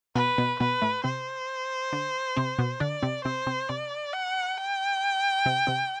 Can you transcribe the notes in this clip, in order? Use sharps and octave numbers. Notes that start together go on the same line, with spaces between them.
B2 B3 B4
B2 B3
B2 B3 B4
A2 A3
C3 C4 C5
D3 D4
C3 C4
B2 B3
D3 D4 D5
C3 C4
C3 C4 C5
C3 C4
C3 C4 D5
F#5
G5
C3 C4
C3 C4